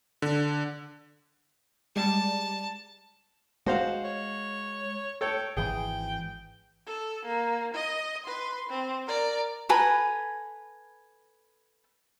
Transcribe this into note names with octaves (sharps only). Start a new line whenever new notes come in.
D3
G3 G#3 D5 A5
G#3 F#4 C5 F5
C#5
A4 C#5 G5
G#1 E3 G#4 G5
A4
A#3
D#5
B4 C6
C4
A#4 D5
A4 B4 G#5 A#5